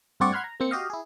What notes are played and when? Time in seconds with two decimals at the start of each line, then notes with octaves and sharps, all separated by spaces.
0.20 G2 A3 C4 F#4 D5 C#6
0.32 F#5 B5 C6 F6 F#6 G#6
0.44 A#5
0.60 A#3 C4 C#7
0.71 F#4 G4 D#5 F5
0.90 E4 G#4